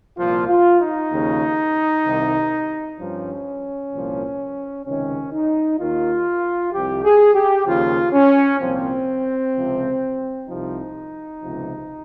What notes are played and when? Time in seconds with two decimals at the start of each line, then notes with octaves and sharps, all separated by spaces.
0.17 C2 A#2 F3 F4
0.48 F4
0.80 D#4
1.11 D#2 C#3 F3
2.04 C2 C3 D#3
2.98 G2 F3 C#4
3.92 C2 A#2 F3
4.85 C#2 C3 D#3 C#4
5.33 D#4
5.79 D#2 D#3 F4
6.73 C2 C3 F3 G4
7.04 G#4
7.35 G4
7.66 D#2 C#3 F3 F4
8.13 C#4
8.60 C2 A#2 F3 C4
9.54 C#2 C3 F3
10.47 C2 C3 F3 D#4
11.41 C#2 C3 F3